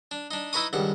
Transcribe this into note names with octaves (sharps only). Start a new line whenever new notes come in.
D4
D4 D#4
D#4 E4 B4 A#5 C#6 D#6
C#2 G2 D#3 F#5